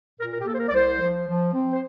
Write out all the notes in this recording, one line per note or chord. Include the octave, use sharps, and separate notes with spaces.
A#2 A#4
A#4
G4
A#3 A4
C5
A#4
D5
C2 C5
F3
F3
C4
C5